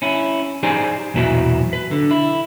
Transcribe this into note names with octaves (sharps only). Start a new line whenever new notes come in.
C#4 E4
D#4 G4 G#4 C5 D5 G#5
B1 E2 A#2 E4 F#4 B4
B4
D3
E4